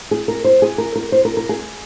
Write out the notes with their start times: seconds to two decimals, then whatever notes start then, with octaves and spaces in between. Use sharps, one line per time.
0.11 G#4
0.28 A#4
0.44 C5
0.62 G#4
0.78 A#4
0.96 A#4
1.12 C5
1.25 A#4
1.37 A#4
1.49 G#4